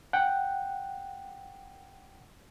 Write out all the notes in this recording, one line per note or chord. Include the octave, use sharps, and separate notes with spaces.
F#5 G5